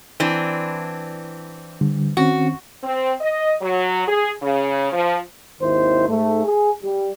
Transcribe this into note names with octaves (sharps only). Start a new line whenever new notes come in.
E3 C4 D4
D3 G3
D#3 C4 C#4 F#4
C4
D#5
F#3
G#4
C#3
F3
G#1 D#2 D#3 E4 C5
G#2 A3
G#4
G3